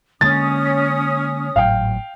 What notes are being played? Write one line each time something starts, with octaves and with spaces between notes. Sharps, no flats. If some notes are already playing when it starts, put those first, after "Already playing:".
D3 G#3 A#3 C#4 D#6 A6
G#1 A2 F#3 F5 G5